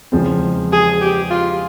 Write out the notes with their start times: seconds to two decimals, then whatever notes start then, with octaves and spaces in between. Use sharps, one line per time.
0.12 E2 C#3 F3 G#3 C4
0.72 G#4
1.01 G4
1.30 F4